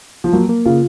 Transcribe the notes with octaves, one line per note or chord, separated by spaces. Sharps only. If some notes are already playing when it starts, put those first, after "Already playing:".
F3
F#3 A#3
A#3
C#3 F4